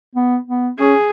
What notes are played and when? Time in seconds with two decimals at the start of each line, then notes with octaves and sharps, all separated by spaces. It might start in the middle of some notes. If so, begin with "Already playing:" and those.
0.15 B3
0.48 B3
0.79 C#4 G#4